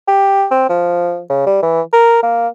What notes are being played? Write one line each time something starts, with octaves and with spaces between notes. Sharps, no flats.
G4
C4
F3
C#3
G3
E3
A#4
A#3